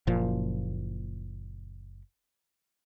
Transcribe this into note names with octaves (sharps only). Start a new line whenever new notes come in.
F#1 A#2 F3